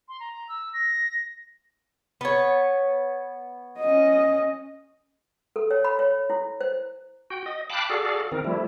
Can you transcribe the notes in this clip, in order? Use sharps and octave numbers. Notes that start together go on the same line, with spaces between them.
C6
A#5
E6
A#6
B3 C#5
C#4 D#5
A4
C#5
B5
C#5
E4
C5
F#4 G5
D#5
F5 G5 A5 B5 D6 F#6
F#4 G#4 A4 D5 F5
D#3 C4 A#4
F3 G3 A3 E4